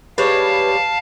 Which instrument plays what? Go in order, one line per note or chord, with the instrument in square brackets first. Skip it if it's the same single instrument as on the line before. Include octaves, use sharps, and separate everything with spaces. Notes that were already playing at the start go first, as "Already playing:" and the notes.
[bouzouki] G3 G#3 C#5 [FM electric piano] B4 [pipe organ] F5 A5